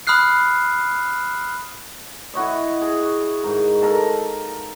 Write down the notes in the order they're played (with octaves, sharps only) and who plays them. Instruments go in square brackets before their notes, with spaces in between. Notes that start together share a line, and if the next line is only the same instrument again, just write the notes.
[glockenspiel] B5 D#6 F6 F#6 C7
[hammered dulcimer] E4 F#4 C#5 D#5
G#4
G#2 A#4
A4 A#4 F5 A5